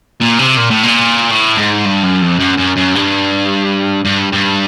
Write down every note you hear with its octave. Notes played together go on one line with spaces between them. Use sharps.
A#2
C3
A#2
A2
A#2
A2
G#2
G2
F#2
F2
F#2
F#2
F#2
G2
G2
G2